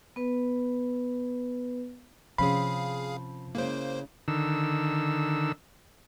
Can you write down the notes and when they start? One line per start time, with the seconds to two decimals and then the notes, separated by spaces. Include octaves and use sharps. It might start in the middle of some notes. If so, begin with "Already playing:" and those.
0.16 B3 B4
2.38 C3 F3 C4 C#4 G#4 F5 B5
3.55 C#3 G#3 A#3 E4 C5
4.28 D3 D#3 E6